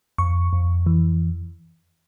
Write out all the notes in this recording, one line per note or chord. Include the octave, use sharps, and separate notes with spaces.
F2 C#6
F2
E3